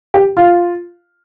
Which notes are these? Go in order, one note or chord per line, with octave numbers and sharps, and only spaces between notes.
G4
F4